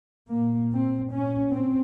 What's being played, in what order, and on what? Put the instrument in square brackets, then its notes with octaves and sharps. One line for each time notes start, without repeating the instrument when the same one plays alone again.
[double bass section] A#2 A#3
C4
A#2 C#4
C4